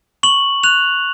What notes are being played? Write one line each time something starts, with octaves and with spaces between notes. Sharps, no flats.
C#6 F#7
F#6 F7